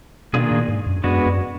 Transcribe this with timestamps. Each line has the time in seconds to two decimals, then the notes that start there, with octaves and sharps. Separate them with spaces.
0.33 B2 D#3 A#3 D4 F4 G#4
0.51 A#2
0.68 G#2
0.86 F#2
1.04 F#2 G#3 B3 D4 F#4 B4
1.26 F#2